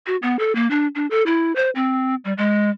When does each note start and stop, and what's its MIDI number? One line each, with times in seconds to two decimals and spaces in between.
0.07 0.16 66
0.22 0.38 59
0.39 0.55 69
0.55 0.69 58
0.71 0.88 62
0.95 1.07 62
1.11 1.23 69
1.26 1.54 64
1.56 1.70 72
1.75 2.15 60
2.25 2.33 55
2.38 2.70 56